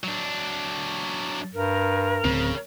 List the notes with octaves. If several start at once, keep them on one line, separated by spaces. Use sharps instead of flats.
F#3 D4
G2 A#4
D1 C#3 C4